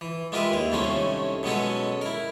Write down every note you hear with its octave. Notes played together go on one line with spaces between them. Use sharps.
E3
G#3 F4 G4 A#4 B4 E5
D#2 F5
C2 A2 D#3 A3 C#4 C5
B2 F#3 G#3 C#4 F#4 A4
E4 A#4